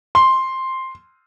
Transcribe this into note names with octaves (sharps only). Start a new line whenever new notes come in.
C6